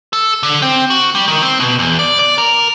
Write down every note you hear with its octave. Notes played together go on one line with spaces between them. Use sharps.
A4
D3
C4
F#4
G3
D#3
C4
B2
E2
D5
D5
A#4